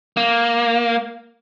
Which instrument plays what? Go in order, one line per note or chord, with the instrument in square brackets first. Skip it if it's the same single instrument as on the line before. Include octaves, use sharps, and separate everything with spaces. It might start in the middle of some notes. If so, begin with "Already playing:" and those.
[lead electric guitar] A#3